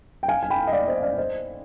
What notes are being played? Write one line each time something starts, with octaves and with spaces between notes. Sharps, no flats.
G5
F5 G#5
G#5
G5 B5
D#5
D5 F5
C5 D#5
D5 F5
C5 D#5